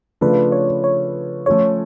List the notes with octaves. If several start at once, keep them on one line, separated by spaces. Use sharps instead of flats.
C#3 F3 A3 D4 F4 B4
C#5
C#5
F3 A3 C#4 F4 A4 C#5